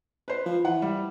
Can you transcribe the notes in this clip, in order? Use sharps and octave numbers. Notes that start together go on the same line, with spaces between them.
B4 C5
F3
E3 F#5
G3